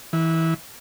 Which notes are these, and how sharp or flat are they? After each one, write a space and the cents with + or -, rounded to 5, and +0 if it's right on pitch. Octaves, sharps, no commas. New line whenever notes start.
E3 -20